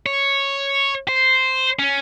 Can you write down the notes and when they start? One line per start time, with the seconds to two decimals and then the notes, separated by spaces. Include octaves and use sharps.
0.06 C#5
1.09 C5
1.79 C#4